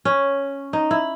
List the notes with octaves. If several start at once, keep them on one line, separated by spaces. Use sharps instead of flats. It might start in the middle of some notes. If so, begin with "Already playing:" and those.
C#4
D#4
E4